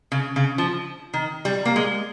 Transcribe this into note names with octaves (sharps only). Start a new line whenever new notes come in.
C#3
C#3
F3
D#3
G3
A#3
G#3